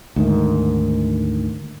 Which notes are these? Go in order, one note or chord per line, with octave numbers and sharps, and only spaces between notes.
D2 G#2 D#3